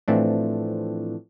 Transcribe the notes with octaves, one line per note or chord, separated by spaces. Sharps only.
A2 E3 F3 A3 C4 D4